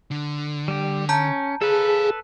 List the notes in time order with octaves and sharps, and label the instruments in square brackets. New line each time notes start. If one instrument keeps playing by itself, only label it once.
[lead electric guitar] D3
[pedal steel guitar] G3 G4
[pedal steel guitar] C#4 [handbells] A5 A#5 G6
[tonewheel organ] G#4 [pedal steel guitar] A4 B4 [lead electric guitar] C#5 F5